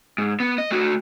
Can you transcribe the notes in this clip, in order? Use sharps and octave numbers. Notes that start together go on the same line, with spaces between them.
G#2
B3
D#5
A3 F#4